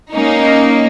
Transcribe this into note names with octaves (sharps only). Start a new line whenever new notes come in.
A#3 C#4 D#4